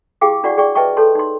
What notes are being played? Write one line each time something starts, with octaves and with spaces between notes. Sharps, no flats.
E4 G4 G#4 F5 G5 D6
D4 E4 F#4 D5 F#5 C#6
G#4 D5 G5 C#6
B4 D#5 E5 G5 A5 C#6
A4 C#5 A5 C6
D#4 C6